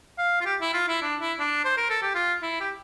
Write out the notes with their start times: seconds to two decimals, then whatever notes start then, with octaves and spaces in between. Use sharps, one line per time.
0.18 F5
0.41 F4
0.46 G4
0.61 E4
0.74 F4
0.88 E4
1.02 D4
1.20 E4
1.39 D4
1.64 C5
1.77 A#4
1.90 A4
2.02 G4
2.14 F4
2.42 E4
2.61 G4